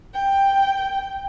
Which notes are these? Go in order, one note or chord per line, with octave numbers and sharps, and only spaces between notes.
G5